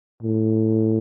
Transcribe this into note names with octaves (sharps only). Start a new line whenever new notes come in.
A2